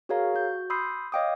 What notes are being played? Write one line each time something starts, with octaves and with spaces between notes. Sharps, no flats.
F#4 G#4 A#4 C#5 F5 A#5
F#4 G6
B5 C6 D#6 E6 G6 C7
C#5 D#5 F5 G5 D6 D#6